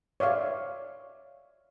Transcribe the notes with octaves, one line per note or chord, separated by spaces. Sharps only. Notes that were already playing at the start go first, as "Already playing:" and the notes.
C#5 D5 E5 F5